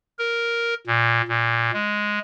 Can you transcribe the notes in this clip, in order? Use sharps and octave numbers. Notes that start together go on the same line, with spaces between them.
A#4
A#2
A#2
G#3